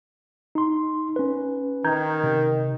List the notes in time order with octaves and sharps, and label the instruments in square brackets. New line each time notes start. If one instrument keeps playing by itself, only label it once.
[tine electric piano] D#4 C6
C#4 B4
[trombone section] D#3 [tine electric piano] A#5 G6 G#6
[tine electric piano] C3